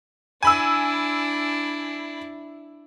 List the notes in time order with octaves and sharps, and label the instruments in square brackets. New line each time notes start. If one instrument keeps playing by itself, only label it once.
[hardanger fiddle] D4 E4 [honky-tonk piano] G#5 B5 E6